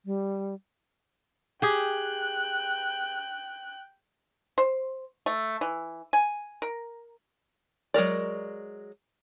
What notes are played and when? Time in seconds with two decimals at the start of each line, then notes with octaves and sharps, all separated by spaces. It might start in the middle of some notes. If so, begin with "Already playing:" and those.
0.06 G3
1.62 G4 G#4 G5 F#6
4.58 C5
5.26 A3
5.61 E3
6.13 G#5
6.62 A#4
7.94 F#3 G#3 A#4 D5